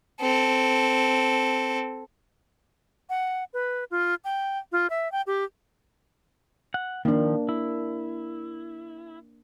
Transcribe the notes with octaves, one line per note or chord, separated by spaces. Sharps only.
C4 A4
F#5
B4
F4
G5
F4
E5
G5
G4
F#5
D#3 F3 A#3 D4
E4